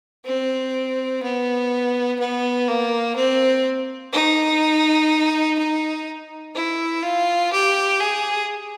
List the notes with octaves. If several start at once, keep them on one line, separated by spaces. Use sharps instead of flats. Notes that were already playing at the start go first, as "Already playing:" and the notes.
C4
B3
B3
A#3
C4
D#4
D#4
E4
F4
G4
G#4